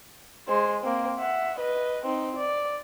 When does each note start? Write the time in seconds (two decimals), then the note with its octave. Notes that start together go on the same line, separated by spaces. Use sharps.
0.48 G#3 C5
0.84 A#3 C4
1.19 E5 F#5
1.59 B4 D#5
2.06 C4 D#4
2.36 D5